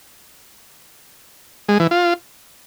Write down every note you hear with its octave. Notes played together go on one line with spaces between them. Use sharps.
G#3
E3
F4